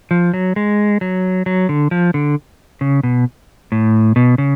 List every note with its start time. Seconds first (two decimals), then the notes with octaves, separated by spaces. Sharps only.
0.11 F3
0.34 F#3
0.56 G#3
1.01 F#3
1.46 F#3
1.69 D3
1.91 F3
2.14 D3
2.81 C#3
3.03 B2
3.72 A2
4.16 B2
4.38 C#3